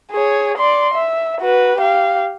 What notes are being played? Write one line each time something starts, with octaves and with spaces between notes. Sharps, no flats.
G#4 C#5
D5 C6
E5
F#4 B4
G4 F5